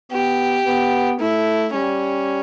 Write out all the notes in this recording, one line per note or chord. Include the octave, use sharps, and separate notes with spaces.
B3 G4
B3
A3 E4
G3 C#4